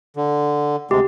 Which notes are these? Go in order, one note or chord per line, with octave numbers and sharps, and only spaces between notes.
D3
D2 C3 G#3 G4